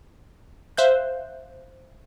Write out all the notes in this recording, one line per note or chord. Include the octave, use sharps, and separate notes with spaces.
C5 E5 F5 F#6 G6